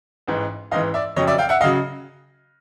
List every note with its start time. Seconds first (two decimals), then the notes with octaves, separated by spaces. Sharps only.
0.28 A1 G#2 E3
0.71 A1 G#2 E3 D#5 F5
0.94 D5 E5
1.16 F1 F2 C#3 F#3 C#5 D#5
1.27 D5 E5
1.38 F5 G5
1.49 E5 F#5
1.61 D#5 F5
1.64 C#3 F#3